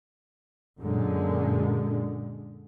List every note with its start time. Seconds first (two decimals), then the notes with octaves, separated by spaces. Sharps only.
0.81 F#2 A#2 D3 G#3